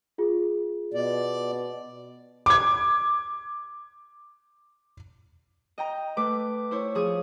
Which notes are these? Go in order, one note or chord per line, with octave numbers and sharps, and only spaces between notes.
F4 G#4
B2 D5
D6 G#6
D#5 G5 A#5
A3 B4 D6
E4 C5 C#5
F3 G#4 D#6